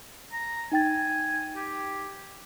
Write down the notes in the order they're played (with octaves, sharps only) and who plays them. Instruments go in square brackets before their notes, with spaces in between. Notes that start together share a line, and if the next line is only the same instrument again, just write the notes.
[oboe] A#5
[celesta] D#4 G5 A6 [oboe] G#5
[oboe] G4